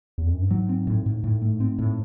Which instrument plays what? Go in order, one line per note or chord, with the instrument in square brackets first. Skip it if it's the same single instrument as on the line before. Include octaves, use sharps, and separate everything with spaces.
[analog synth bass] E2
F2
F#2
G2
[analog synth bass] G#2 [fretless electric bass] F#3
[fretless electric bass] C4
A2
A2
A2
A3
C4
A2